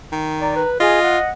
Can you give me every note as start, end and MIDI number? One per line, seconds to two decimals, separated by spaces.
0.12 0.63 51
0.41 0.53 74
0.41 0.69 82
0.56 0.75 71
0.80 1.18 65
0.80 0.99 68
0.80 1.29 75
1.03 1.30 78